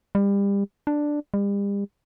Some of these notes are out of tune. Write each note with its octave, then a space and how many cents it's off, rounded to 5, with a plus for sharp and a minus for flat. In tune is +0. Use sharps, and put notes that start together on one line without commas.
G3 +30
D4 +5
G3 +40